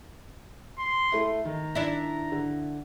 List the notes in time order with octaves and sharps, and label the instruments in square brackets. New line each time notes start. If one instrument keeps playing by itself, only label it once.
[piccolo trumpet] C6
[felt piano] A3 E4
[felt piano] D#3 [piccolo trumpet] A#5
[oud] D4 E4
[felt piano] D3